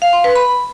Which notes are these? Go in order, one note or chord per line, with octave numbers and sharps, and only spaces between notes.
F5
C6
B4
B5